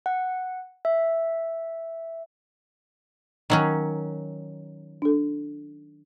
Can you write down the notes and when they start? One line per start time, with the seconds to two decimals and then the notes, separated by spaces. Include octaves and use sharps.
0.06 F#5
0.85 E5
3.50 D#3 F#3 C#4
5.02 D4 A4